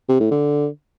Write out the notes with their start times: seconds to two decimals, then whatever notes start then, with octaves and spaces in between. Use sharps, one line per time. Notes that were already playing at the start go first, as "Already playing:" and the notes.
0.09 C3
0.20 A2
0.31 D3